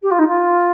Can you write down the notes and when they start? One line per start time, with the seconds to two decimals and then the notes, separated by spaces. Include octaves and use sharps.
0.02 G4
0.10 F4
0.18 D#4
0.27 F4